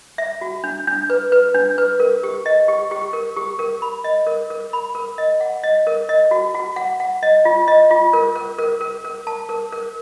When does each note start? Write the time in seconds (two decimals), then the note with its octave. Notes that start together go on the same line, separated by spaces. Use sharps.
0.18 E5
0.41 F#4
0.64 D4
0.87 D4
1.10 B4
1.32 B4
1.55 D4
1.78 B4
2.00 A#4
2.23 G4
2.46 D#5
2.68 G4
2.91 G4
3.13 A#4
3.36 G4
3.59 A#4
3.82 B5
4.04 D#5
4.27 A#4
4.50 A#4
4.73 B5
4.95 A#4
5.18 D#5
5.40 F#5
5.63 D#5
5.87 A#4
6.09 D#5
6.31 F#4
6.54 F#4
6.76 F#5
7.00 F#5
7.23 D#5
7.45 F4
7.68 D#5
7.91 F4
8.13 A#4
8.36 A#4
8.59 A#4
8.81 A#4
9.05 A#4
9.27 A5
9.49 A#4
9.72 A#4